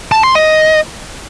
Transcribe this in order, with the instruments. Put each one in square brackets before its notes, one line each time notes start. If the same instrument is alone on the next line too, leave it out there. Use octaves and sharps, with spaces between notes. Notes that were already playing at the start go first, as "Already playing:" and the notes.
[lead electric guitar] A5
C6
D#5